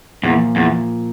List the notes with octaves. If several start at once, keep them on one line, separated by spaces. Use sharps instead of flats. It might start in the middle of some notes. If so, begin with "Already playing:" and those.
E2 A#2 F3 A#3
E2